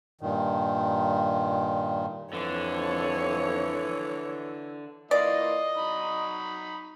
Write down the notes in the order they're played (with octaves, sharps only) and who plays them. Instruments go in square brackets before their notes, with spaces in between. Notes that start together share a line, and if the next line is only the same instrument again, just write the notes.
[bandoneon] G2 A#2 D#3
[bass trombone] F2 [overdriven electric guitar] D3 [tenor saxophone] E3 [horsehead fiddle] C#5
[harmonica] E3 A#3 F4 [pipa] D5 [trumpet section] D#5
[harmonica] F#3 D#4 B5